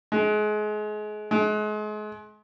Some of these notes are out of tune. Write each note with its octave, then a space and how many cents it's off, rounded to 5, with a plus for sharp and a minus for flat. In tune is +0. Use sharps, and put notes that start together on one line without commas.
G#3 +30
G#3 +35